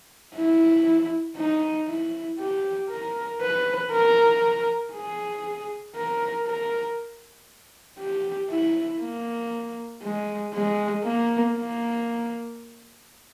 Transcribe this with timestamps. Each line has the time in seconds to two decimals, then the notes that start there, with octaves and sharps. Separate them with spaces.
0.35 E4
1.37 D#4
1.88 E4
2.39 G4
2.90 A#4
3.41 B4
3.91 A#4
4.93 G#4
5.96 A#4
6.46 A#4
7.99 G4
8.50 E4
9.01 A#3
10.02 G#3
10.53 G#3
11.04 A#3
11.56 A#3